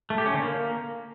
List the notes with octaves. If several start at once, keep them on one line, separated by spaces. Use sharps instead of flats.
A3
G4
C#4
D3
A#3